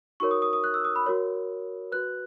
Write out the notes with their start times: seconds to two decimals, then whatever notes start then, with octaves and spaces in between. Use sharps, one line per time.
0.20 D#4 F#4 A#4 C#5 C#6
0.31 D#6
0.42 D#6
0.53 D#6
0.64 F#6
0.74 E6
0.85 D#6
0.96 B5
1.06 F#4 A#4 C#5
1.92 F#4 B4 F#6